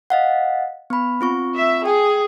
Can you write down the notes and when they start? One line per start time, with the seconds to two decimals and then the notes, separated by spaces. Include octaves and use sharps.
0.10 D#5 F5 F#5
0.90 B3 B5
1.21 C4 F4 C#6
1.57 E5
1.86 G#4 G5